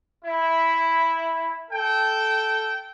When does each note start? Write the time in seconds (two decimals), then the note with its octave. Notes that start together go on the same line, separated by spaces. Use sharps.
0.24 E4
1.71 A4 G5